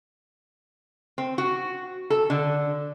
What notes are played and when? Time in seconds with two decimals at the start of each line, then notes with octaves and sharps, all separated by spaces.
1.18 C4
1.38 F#4
2.10 A4
2.30 D3